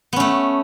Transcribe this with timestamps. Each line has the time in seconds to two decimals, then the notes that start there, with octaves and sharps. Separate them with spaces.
0.13 B3
0.16 C#4
0.20 A3